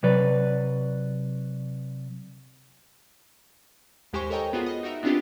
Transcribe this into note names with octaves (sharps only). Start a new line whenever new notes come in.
C3 F#3 B4 D5
D#2 G#3 G4 C5 G#5 C#6
A4 A#4 C#5 D#5 G5 A#5
B3 F4 F#4 G#4
D#5
D#4 F#4 A#4 E5
B3 C4 D4 F4 G4